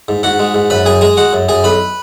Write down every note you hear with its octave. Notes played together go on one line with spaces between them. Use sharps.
G#2
G#2 F#4 F#5
G#3
G#2
F#2 B4 B5
F#2 G#4 G#5
G#3 G#4 G#5
G#3 F#4 F#5
F#2
F#2 G#4 G#5
B1 B4 B5